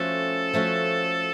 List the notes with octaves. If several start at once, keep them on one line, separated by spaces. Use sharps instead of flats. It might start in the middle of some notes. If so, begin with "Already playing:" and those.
Already playing: F3 A3 C#4 F#4 A4
F3 A3 C#4 F#4